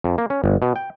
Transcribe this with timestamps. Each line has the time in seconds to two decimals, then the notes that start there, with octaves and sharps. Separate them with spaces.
0.04 F2
0.18 A#3
0.30 C#4
0.44 G1
0.62 B2
0.76 G5